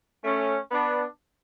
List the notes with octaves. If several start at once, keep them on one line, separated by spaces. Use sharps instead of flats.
A3 C#4
B3 D4